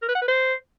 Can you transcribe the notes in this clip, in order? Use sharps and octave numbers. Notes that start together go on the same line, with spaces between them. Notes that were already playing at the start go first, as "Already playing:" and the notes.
A#4
B4
F#5
B4
C5